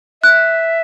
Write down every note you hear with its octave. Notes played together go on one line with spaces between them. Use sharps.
E5 F#6